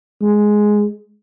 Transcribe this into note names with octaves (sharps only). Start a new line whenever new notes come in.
G#3